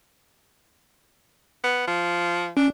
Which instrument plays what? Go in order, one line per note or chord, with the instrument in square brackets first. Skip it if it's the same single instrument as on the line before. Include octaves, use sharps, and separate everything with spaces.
[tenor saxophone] B3
F3
[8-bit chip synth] C#4 [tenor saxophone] D4